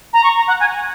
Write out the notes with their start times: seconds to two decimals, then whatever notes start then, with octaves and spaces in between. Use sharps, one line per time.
0.13 A#5
0.24 C#6
0.36 A#5
0.48 F#5
0.60 G#5